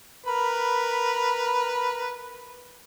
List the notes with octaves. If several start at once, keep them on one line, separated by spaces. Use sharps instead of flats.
A#4 B4 B5